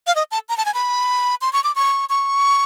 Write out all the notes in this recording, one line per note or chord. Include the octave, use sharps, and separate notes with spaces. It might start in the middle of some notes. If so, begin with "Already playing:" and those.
F5
D#5
A5
A#5
A5
G#5
B5
C6
C#6
D6
C#6
C#6